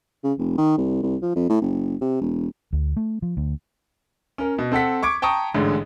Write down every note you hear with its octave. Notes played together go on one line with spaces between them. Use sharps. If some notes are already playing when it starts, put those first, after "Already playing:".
C#3
F1
D#3
C2
C2
F3
F2
A2
F#1
C3
E1
D2
A3
F3
D2
C#4 A#4
B2
C4 A4 F#5 B6
C#6 D6 G#6 D7
G5 A5 A#5 C#6 D#6
A1 G#2 D3